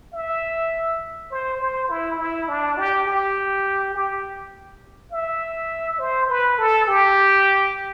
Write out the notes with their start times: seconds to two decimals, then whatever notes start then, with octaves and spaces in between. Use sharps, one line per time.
0.13 E5
1.31 C5
1.60 C5
1.90 E4
2.18 E4
2.48 D4
2.78 G4
3.06 G4
3.95 G4
5.12 E5
5.99 C5
6.29 B4
6.58 A4
6.88 G4